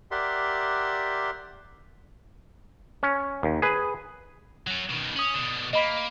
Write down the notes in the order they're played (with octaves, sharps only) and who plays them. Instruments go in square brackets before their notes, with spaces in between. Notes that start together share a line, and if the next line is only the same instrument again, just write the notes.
[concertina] G4 A#4 D5 E5 F#5 C6
[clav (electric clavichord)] C#4
D#2
G#4 B4
[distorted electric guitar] F#3 C#4
B2 D#3
[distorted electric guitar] C#4 [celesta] D#6 F#7
[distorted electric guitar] B2 D3
[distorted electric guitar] A#3 [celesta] D#5 B5 B6